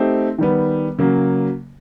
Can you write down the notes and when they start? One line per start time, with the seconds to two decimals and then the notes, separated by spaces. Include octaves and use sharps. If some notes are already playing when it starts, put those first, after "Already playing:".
Already playing: A3 C4 D#4 G4
0.38 D#3 G3 B3
0.99 C#3 F#3 A#3